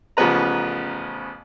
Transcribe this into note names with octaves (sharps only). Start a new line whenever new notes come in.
A1 C#3 F3 B3 B4 A#5